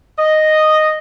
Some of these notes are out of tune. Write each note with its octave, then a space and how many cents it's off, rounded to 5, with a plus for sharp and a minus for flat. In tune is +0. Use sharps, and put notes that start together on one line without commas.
D#5 -5